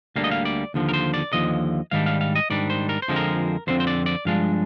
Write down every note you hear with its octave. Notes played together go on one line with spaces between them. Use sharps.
D2 D3 G3 A#3 D4 F5
D#5
F5
D5
D#2 D3 F3
A#4
C5
D5
D#2 D3 F3 D#5
G#2 D#3 G3 D4 F5
F5
F5
D#5
G#2 D#3 G3 D4 D5
C5
A#4
C5
F2 D3 F3 G#3 C4
A#4
F2 D3 F3 C4 C5
C5
D5
D5
G2 F3 G#3 D4 F5